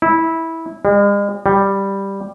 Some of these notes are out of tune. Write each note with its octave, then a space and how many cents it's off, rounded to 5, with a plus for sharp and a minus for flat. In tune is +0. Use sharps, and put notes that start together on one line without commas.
E4 -15
G#3 -45
G3 +5